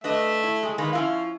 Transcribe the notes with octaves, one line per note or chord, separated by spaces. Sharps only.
A3 D4 B4 D#5 E5
E4
G#3 G#4
D#3 G#3 A#3 B4
F3 C#4 E4 F4 F5